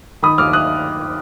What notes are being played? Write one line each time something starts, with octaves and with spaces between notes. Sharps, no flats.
D#3 B5 D#6
D#2 D6 F6
D#6 F#6